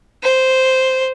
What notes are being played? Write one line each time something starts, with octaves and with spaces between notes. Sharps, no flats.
C5